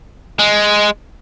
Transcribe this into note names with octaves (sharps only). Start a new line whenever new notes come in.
G#3